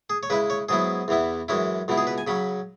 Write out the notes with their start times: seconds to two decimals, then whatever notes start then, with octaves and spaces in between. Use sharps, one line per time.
0.10 G#4
0.23 C#5
0.30 C#3 G#3 E4 B4
0.50 C#5
0.69 G#2 F#3 B3 E4 G#4
1.08 E2 E3 B3 E4
1.48 F#2 E3 G#3 C#4 E4
1.88 C#2 B2 B3 E4
1.97 G#4
2.07 B4
2.18 G#5
2.27 C#3 F#3 C#4 B5